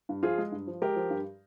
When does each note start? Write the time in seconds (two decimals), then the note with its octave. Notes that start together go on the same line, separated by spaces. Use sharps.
0.09 G2
0.23 F3 F4 G#4
0.38 G#3
0.52 G2
0.67 F3
0.82 G#3 G4 A#4
0.96 F3
1.10 G2